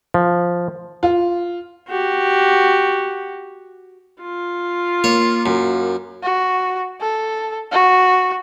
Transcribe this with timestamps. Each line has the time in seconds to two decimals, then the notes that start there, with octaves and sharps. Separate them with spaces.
0.14 F3
1.03 F4
1.88 F#4 G4
4.22 F4
5.04 A#3 C#5
5.46 F#2
6.23 F#4
7.01 A4
7.72 F#4